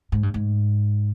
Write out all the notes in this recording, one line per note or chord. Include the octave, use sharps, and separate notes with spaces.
G#2
G2
G#2